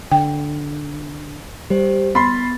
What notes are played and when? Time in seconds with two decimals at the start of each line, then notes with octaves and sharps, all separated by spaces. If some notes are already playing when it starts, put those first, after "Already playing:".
0.11 D3 G5
1.70 G3 G4 C5
2.15 B3 B5 C6 A6